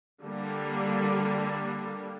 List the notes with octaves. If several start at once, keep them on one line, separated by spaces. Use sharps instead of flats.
D3 G3 A#3